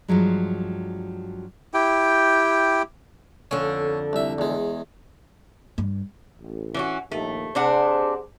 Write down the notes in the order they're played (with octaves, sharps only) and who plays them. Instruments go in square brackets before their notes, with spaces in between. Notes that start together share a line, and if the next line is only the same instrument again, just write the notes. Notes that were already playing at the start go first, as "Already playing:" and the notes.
[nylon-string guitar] G2 F3 F#3 G#3
[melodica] E4 G4 G5
[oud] F2 D3 [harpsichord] C#4
[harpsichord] C2 E5
E2 G#3
[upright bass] G2
[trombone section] A1
[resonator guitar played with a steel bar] E3 C#4 F#4
[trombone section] A#1 D#2 [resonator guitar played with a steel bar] A3
[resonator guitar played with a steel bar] C3 D4 F#5 [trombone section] G#4 C5